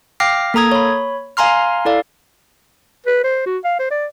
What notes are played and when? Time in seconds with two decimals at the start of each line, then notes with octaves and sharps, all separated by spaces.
0.20 F5 G5 D6 F6 A#6 C7
0.54 A#3 A4 A#5 D#6 G#6
0.72 C#5 B5
1.37 F5 G#5 A#5 C6 F6
1.85 E4 A4 D5 F5
3.06 B4
3.24 C5
3.46 F#4
3.64 F5
3.79 C5
3.91 D5